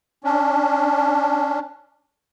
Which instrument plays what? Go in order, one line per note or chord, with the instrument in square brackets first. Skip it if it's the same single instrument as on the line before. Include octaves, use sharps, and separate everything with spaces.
[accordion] C#4 D4